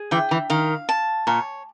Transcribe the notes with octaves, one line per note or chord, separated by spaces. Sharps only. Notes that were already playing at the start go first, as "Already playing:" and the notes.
Already playing: G#4
E3 G5
E3
D#3 F5
A5
A#2 C#5